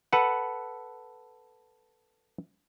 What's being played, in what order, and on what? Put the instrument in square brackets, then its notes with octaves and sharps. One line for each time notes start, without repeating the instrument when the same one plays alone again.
[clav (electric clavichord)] A4 B4 F#5